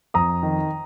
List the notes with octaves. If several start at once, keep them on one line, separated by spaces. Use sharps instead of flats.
F2 A#5 D#6
D#3